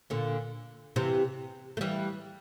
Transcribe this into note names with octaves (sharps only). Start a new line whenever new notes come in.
A#2 D3
C3 E3
A3
E3 G3